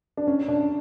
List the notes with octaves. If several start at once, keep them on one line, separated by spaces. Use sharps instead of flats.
D4
C#4
D4